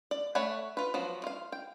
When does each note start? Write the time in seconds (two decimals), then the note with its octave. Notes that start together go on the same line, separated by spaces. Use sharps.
0.11 D5
0.35 A3 C#5 D5 F#5 B5
0.77 F4 B4
0.94 F3 F#3 B3
1.24 F4 F5
1.52 G5